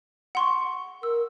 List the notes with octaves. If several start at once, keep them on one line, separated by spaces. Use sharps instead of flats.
F#5 C6 C#6
A#4 E6